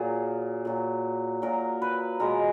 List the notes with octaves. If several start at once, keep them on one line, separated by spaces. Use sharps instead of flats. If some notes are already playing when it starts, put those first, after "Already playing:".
Already playing: A#2 F#3 G#4 A#4
A#2 F#3
A#2 F#3 A#4
B4
B2 G#3 A#4